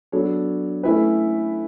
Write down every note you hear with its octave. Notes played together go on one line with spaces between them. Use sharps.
F#3 B3 D4 A4 C#5
A3 C#4 E4 B4